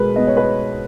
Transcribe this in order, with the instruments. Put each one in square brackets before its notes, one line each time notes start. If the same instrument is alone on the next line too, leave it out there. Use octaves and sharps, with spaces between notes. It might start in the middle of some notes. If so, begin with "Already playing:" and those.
Already playing: [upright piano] B2 G#3 A#4 B4
B3 D#5
C#5
B4